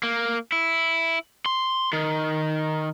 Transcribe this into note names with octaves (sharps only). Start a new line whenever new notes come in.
A#3
E4
C6
D#3